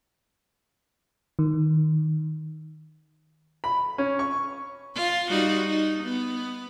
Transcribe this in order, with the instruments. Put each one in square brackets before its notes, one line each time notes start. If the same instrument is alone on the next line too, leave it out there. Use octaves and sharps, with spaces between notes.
[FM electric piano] D#3
[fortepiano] B5
C#4
C#6
[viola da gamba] F4
G3 D#4 F#4
D#4
B3